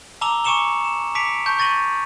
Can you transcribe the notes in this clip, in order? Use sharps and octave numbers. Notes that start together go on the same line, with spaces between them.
A5 A#5 D6 E6 F7 G7
G#5 C#6 D6 C#7 E7 G7
E7
A5 D6 B6 C#7 D7 F7
A5 C#6 G6
C#6 A6 A#6 D#7 F#7